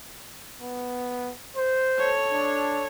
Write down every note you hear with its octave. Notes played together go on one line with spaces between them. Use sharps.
B3
C5
A4 C#5
D4